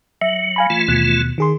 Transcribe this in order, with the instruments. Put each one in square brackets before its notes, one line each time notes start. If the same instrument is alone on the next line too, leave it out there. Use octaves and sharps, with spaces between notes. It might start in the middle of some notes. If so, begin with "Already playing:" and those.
[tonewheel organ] F#3 [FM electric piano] E5
[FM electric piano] F5 G#5 B5
[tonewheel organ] E3 A3 F4
[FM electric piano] D#2 B2 F#6
D#3 G#4 C6